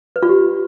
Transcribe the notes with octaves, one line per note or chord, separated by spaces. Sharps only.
B4
F4
G4